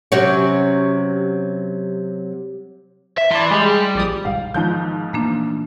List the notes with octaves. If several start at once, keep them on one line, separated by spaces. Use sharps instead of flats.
C3 F#3 C#4
E5
E3 D5 A5 B5 C6
G3 G#3
A#1 D5 D#6
B1 G#2 D#3 F5
G#2 D#3 F3 G#3 B3 G6
A#2 E3 A3 A#3 D4